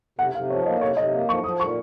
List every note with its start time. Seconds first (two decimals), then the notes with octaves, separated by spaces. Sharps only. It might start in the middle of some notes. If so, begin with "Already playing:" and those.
0.19 C3 F#5
0.34 C3 F5
0.50 F3 C#5
0.66 A#3 D#5
0.81 C3 C#5
0.97 C3 D#5
1.13 A#3
1.29 F3 C#6
1.44 F3 D#6
1.60 A#2 C#6